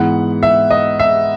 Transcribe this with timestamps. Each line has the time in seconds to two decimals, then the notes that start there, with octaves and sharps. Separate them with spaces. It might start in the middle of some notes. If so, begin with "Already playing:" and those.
Already playing: G#2 E3 B3 F#5
0.43 E5
0.71 D#5
1.00 E5